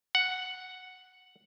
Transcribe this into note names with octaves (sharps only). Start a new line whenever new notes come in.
F#5